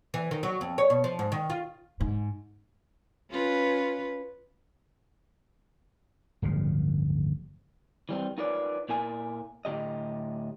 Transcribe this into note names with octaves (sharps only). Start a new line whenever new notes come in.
E3
D#3
F#3
F2
C#5
B2
F3
G#2
D#3
F4
G#2
C#4 F4 B4
D1 G1 C#3 F3
E3 G3 C4
D#4 F4 A#4 B4 C#5 D5
A#2 E4 A#4 G#5
D2 A2 C#3 G4 D#5